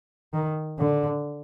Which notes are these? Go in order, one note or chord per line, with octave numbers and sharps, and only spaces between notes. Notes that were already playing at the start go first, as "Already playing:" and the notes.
D#3
D3